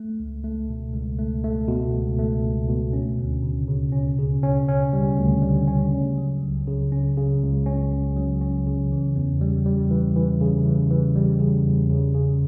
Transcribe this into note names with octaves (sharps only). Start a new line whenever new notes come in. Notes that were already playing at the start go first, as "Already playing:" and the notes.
Already playing: A3
C#2
A3
B2
C#2
A3
A3
B2
C#2
A3
C#2
B2
C#4
D2
C#3
C#3
C#4
C#3
C#4
C#4
G3
D2
G3
C#4
C#3
F#3
C#2
C#3
C#4
C#3
C#2
C#4
C#2
F#3
C#4
C#3
E3
E2
G3
G3
E3
E3
C#3
E3
E3
G3
C#3
E2
C#3
C#3